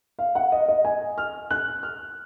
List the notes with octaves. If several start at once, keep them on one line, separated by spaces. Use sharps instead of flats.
F5
F#5
D#5
D#5
G#5
F6
F#6
F6